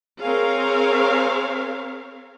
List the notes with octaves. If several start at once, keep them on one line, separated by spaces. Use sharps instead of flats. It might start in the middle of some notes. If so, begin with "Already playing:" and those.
C4 G#4 A#4 C#5 F5